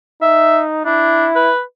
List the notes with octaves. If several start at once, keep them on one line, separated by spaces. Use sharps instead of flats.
D#4 E5
D4 E4
B4